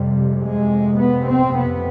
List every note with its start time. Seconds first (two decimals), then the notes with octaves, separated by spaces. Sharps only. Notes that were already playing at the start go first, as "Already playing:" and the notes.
Already playing: F2 C3 G3
0.40 G#3
0.98 B3
1.26 C4
1.55 F2 C3 B3